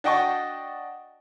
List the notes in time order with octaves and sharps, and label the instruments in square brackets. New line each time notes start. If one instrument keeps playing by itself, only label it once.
[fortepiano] D4 F#4 D#5 G5 A5 C#6